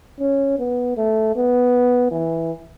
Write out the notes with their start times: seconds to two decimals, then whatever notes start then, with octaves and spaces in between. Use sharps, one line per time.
0.20 C#4
0.59 B3
0.97 A3
1.36 B3
2.11 E3